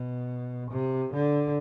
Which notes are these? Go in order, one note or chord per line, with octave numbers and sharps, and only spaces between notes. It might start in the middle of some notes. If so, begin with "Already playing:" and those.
Already playing: B2
C3
D3